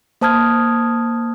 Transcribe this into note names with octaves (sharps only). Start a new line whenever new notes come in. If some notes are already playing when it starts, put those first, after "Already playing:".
A#3 C5 A5 D#6 F6 G#6